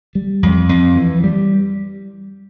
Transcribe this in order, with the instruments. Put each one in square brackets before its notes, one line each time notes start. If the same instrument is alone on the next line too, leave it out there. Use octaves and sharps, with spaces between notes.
[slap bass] G3
F2
F2
E3
G3